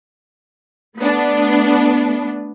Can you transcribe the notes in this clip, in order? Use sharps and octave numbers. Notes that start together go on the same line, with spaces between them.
A3 B3 D4